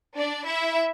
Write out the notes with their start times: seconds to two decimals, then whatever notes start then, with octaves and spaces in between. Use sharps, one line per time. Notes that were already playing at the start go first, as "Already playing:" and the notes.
0.16 D4 D5
0.46 E4 E5